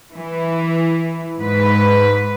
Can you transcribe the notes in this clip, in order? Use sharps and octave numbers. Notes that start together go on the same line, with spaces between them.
E3
G#2 B4